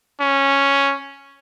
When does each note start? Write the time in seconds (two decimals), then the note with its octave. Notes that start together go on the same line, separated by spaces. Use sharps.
0.21 C#4